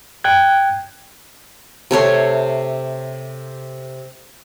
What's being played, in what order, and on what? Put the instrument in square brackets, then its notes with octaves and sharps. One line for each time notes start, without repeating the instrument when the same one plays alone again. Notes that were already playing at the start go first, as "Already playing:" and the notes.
[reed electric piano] G5 F#6 G#6
[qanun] C3 A3 C#5 C6